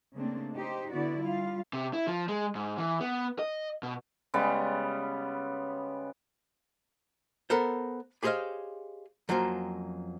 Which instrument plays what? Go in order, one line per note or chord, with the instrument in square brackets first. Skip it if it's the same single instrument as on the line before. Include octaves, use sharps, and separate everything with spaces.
[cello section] C#3 A3 A#3 C4 D4
D#4 G4 C5
D3 B3 E4 F#4 D5
G3 F4 F5
[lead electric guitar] C3
E4
F3
G#3
G#2
E3
B3
D#5
B2
[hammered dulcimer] C#3 G3 G#3 B3
[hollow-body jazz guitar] B3 A4 A#4 C5
G4 G#4 C5 C#5 D#5 F5
F2 F#3 A#3 C#4 C5